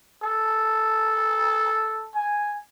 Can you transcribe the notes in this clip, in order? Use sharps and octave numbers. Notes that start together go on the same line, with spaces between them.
A4
G#5